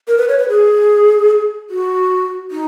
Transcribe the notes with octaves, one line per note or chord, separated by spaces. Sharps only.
A#4
B4
C#5
B4
G#4
F#4
D#4